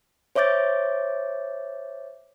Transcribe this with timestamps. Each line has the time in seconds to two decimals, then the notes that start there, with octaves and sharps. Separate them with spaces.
0.35 C5 C#5 E5 D6 G6 A6